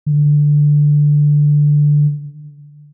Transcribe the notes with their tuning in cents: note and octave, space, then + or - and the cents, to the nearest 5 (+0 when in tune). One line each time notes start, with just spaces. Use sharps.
D3 +5